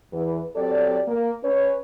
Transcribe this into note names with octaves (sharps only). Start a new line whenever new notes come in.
E2 E3 B4
F#3 C4 G4 A4 D5
A#3
C#4 B4 C#5